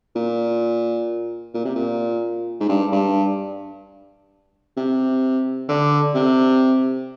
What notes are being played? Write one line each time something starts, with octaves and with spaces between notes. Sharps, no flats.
A#2
A#2
C3
A#2
G#2
G2
G2
C3
D3
C3